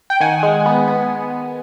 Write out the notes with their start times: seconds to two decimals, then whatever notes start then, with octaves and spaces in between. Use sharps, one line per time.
0.10 G5
0.20 D#3 F#5 G#5
0.43 G#3
0.66 B3
0.88 B3